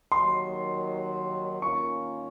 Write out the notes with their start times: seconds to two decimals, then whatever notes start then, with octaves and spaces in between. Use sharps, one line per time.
0.12 D#2 D#3 F#3 C6
1.62 D#3 A#3 C#4 F4 C#6